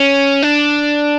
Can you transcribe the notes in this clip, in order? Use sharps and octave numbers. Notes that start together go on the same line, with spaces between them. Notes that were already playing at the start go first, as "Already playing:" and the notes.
Already playing: C#4
D4